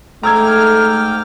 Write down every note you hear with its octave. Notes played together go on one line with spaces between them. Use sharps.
G#2 A3 G5 A#5 D6 E6 F6 G#6